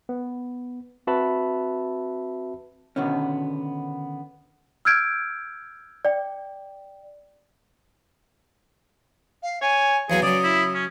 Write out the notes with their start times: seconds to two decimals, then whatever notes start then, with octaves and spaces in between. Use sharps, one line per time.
0.09 B3
1.07 C4 F#4 B4 E5 A5 B5
2.96 B2 D3 D#3 B3 C#4
4.85 E6 F6 G6 G#6 D7
6.05 D5 G5
9.43 F5
9.62 C#5 G#5
10.10 E2 F#3 B3 G#4 F5
10.22 C#3 F#3 D5 D#6
10.43 E4
10.74 C#4